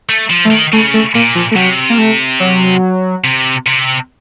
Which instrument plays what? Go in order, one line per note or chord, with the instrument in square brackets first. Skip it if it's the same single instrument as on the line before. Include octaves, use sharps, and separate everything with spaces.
[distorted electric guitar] A3
F3
[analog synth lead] A3
[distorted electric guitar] D#3
[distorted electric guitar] C#3 [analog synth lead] A3
[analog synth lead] A3
[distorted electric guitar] A#2 [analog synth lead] A#3
[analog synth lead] F3
A3
[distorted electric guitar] C3 [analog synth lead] F#3
[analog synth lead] A#3
A3
F#3
[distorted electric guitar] C3
C3